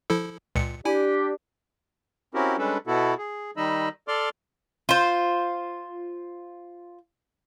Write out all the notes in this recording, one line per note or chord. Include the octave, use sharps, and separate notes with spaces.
F3 E4 A4
C#2 A#2 C#7
D4 E4 G4 G#5
C4 C#4 E4 F#4 G4 A#4
G3 G#3 C#4 D4 A4 B4
B2 B3 E4 F#4 A4
G#4
D#3 G3 D#4 D#5 B5 E6
A4 D5 C6 D6 F6
F4 C5